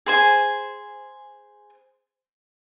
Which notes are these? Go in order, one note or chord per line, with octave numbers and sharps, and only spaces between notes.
G#4 C5 G#5